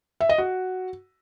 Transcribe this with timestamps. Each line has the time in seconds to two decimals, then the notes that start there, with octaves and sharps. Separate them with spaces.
0.21 E5
0.29 D#5
0.38 F#4